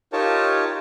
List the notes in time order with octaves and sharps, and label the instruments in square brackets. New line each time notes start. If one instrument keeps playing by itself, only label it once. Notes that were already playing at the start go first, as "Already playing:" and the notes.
[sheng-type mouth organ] D#4 F4 G4 A#4 C#5 A5